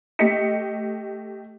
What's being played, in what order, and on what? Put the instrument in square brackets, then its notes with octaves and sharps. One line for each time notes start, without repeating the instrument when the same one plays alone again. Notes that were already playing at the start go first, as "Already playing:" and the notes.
[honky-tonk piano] A3 G4 D#5 B6 C#7